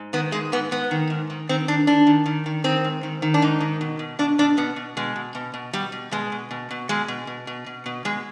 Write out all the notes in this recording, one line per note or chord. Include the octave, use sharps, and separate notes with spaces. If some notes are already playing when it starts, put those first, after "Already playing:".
Already playing: G#2
D#3 B3
G#2 G#3
G#2 B3
G#2 B3
D#3
G#2
D#3
D#3 C4
D#3 D4
D#3 D4
D#3
D#3
D#3
D#3 C4
G#2
D#3
D#3
D4
G#2 D#4
D#3
B2
B2
B2 D4
B2 D4
B2 B3
B2
B2 G#3
B2
B2
B2
B2 G3
B2
B2 G#3
B2
B2
B2
B2 G#3
B2
B2
B2
B2
B2
B2 G#3